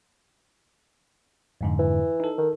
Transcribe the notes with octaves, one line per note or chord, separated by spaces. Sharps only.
F2 G#2 D3
E3
D#4 A4
D#3